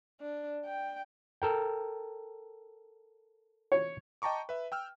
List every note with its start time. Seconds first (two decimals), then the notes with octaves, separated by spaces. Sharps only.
0.21 D4
0.65 G5
1.42 A4 A#4 G5
3.72 C#5
4.22 D#5 G5 A5 A#5 C#6 D6
4.49 B4 E5
4.72 G5 E6 F6